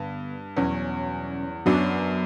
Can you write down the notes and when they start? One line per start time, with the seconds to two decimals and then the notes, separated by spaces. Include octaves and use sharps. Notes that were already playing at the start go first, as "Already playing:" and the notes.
Already playing: G2 D3 B3
0.57 E2 B2 F#3 C#4
1.66 F#2 F#3 B3 D4